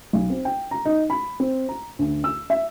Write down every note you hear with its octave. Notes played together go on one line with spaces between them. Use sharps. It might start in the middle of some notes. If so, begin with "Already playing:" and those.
B1
C4
G5
A#5
D#4
B5
C4
A#5
D2
E6
E5